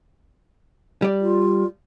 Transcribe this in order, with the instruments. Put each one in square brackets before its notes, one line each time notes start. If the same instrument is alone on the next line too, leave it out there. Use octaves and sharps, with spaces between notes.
[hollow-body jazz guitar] G3 D5
[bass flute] F4